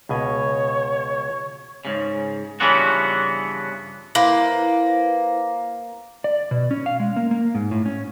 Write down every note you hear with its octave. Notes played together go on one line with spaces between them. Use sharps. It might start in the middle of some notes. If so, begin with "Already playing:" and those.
C#2 B2 C#5 G#5
G#2 C#3
G2 C#3 E3 F3 B3 F#4
A#3 E4 B4 C5
D5
B2
C#4
F5
G#3
A#3
A#3
G#2
A2
C#4